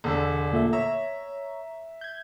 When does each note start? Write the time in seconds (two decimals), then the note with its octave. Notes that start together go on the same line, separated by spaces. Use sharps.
0.04 E1 D3 A4
0.53 A#2 A3 E5
0.73 C#5 E5 A#5
2.01 G6 G#6